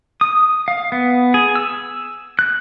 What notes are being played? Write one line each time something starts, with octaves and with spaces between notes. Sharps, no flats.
D#6
F5
B3
G#4
E6
F#6